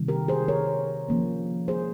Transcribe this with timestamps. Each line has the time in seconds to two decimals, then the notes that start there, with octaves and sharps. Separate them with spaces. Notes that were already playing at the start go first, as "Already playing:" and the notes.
Already playing: C3 D#3 G3
0.08 G4 A#4
0.28 G#4 C5
0.48 A#4 C#5
1.08 F3 A#3 C#4
1.68 G#4 C5